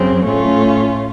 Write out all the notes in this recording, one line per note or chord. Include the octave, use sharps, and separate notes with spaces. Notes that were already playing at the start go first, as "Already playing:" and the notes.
Already playing: F#2 C#3 C4
A2 A3 C#4 F4